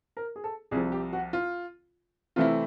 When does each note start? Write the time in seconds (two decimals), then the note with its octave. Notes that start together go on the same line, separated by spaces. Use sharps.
0.17 A#4
0.36 G#4
0.44 A4
0.71 C2 C3 F3 G#4
0.92 G4
1.13 F#4
1.33 F4
2.36 C3 E3 A3 C4 E4 F4